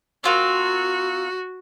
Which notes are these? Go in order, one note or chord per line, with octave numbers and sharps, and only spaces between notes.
C4 F4 F#4 A#4